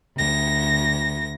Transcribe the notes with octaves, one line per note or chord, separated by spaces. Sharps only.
D2 A#6